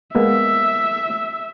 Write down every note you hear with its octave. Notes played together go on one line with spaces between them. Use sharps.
G#3 A#3 B3 E5